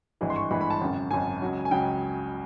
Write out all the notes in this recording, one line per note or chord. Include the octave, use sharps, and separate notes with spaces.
G#1 G2 E3 G#3
C6
C#6
G#1 G2 E3 G#3 B5
B5
A5
G#1 F#2 C#3
G#1 F#2 C#3 G#5
C#2 C#3 F#3
G#5
C#2 C#3 F#3 G5